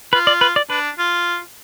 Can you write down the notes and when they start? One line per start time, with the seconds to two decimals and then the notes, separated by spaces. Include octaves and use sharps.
0.13 F4 B4
0.27 D5
0.41 B4
0.56 D5
0.70 D4 B4
0.98 F4